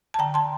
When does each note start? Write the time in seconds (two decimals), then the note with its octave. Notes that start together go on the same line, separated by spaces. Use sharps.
0.14 A5
0.19 D3 G5 A#5
0.34 A5 C6